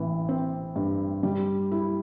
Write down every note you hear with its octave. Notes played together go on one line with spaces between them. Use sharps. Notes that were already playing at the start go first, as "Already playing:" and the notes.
Already playing: A1 E3
C4
G2
G3
E4